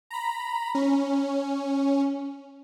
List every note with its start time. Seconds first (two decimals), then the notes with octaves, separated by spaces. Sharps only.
0.10 A#5 B5
0.75 C#4